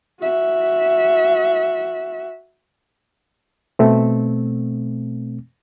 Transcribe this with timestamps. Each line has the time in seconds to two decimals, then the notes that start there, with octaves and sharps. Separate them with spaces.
0.20 F#4 E5
3.79 B2 A3 C4